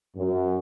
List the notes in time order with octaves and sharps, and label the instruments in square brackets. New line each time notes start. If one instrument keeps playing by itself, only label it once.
[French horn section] F#2